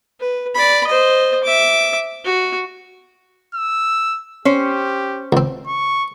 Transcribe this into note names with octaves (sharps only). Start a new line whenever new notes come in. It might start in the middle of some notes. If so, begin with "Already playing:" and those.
B4
D5 B5
C5 D#5
E5 D6
F#4
E6
C#4 G4 C5
C#2 C4
C#6